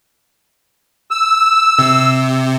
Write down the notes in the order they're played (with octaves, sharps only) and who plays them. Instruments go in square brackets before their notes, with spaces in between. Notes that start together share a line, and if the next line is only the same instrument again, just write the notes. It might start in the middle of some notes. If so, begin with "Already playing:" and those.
[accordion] E6
[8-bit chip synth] C3